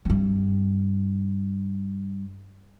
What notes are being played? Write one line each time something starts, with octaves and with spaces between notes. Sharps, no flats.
G2 C4